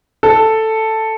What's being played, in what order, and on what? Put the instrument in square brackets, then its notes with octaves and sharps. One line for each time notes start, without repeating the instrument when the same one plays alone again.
[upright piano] A4